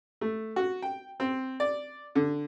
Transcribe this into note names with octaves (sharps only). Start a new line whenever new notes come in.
A3
F#4
G5
C4
D5
D3